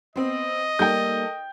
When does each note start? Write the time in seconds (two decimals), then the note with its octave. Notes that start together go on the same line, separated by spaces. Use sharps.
0.16 B3 C4 C5 D#5
0.79 G3 A#3 D#4 A4 G5 G6